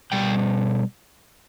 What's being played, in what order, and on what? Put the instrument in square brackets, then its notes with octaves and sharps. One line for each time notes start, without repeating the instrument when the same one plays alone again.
[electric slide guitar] B2 G3 G5